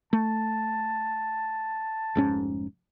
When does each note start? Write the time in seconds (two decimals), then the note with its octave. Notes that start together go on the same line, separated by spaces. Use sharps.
0.13 A3 A5
2.15 F1 G#2 C#4